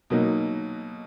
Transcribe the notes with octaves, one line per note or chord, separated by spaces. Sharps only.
B2 F#3 A#3 D#4